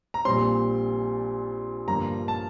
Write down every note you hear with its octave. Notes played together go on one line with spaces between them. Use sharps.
A#5
A#1 A#2 G3 C4 C6
G1 G2 D3 F3 A#3 A#5
A5